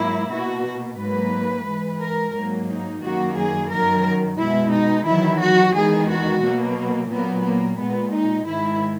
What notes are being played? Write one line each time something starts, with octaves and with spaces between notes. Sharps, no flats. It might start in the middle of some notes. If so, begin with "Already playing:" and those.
Already playing: G#2 F#3 A#3 E4
B2 A#3 F#4
G#2 F#3 A#3 B4
G#2 E3 G#3
A#4
G#2 F#3 A#3
D#4
F#2 D#3 F#3 A#3 F#4
G#4
F#2 D#3 F#3 A#4
B2 G#3 E4
D#4
E2 D#3 F#3 E4
F#4
E2 D#3 G#3 G#4
F#4
B2 F#3 A#3
A#2 F#3 A#3 B3
A#3
A#2 G#3 B3
D#4
G#2 D#3 G#3 E4